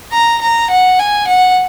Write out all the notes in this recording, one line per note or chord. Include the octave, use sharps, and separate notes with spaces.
A#5
A#5
F#5
G#5
F#5